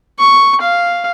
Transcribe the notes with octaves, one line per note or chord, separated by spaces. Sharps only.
C#6
F5